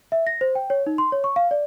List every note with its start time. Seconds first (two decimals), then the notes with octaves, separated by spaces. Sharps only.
0.12 E5
0.27 A#6
0.41 C5
0.55 G5
0.70 C#5
0.86 D#4
0.98 C6
1.12 C#5
1.24 C#6
1.36 F5
1.51 D5